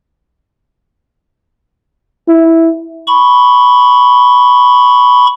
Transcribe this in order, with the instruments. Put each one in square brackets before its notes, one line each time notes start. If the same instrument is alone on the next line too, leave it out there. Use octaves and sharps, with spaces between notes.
[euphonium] E4
[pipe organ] B5 C#6